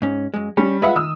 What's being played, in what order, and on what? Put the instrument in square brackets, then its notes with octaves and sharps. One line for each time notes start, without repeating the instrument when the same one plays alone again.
[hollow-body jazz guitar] G#2 C#4
F#2 G#3
[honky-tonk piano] G3 [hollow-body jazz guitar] C#4
[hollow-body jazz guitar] G#3 B4 F#5 [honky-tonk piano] F4 E5 B5
[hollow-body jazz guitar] D#3 [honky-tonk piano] D#6 E6